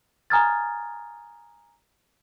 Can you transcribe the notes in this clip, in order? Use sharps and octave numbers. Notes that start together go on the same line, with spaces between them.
G#5 A#5 D#6 F6 G#6 A6